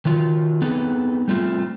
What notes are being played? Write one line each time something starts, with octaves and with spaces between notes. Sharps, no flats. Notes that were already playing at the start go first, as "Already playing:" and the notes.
D#3 F#3 F4
B3 C4 D#4 G#4 A4 B4
G3 A3 C4 F4